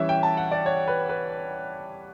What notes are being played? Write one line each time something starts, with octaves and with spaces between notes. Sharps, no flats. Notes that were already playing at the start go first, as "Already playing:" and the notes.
Already playing: E3 G3 C#4 E5
G5
A5
F#5
D5
C#5
B4
B4